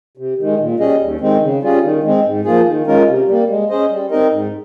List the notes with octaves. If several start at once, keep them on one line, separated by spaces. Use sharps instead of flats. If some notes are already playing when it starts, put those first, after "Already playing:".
C3
D#3 G#3
A#2
G3 C#4 G#4 D#5
D#2
D#3 G#3 C4
C#3
G3 C#4 F4 G#4
D#3
G#3 C4
G#2
F3 A#3 F4 G#4
D#3
G#3 C#4 F4 A#4
C3
G3 A#3
G#3
C#4 G#4 C5 D#5
G3
C4 D#4 A#4 D#5
G#2